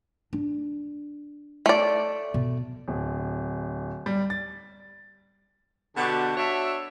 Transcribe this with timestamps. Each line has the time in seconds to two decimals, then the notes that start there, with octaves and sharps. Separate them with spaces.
0.33 D4
1.66 A3 D5
2.34 B2
2.88 D1
4.06 G3
4.30 A6
5.96 B2 D3 F#4 G4 A5
6.37 D4 F#4 C#5 E5